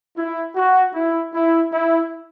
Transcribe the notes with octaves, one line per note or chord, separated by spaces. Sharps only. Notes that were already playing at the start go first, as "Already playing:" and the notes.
E4
F#4
E4
E4
E4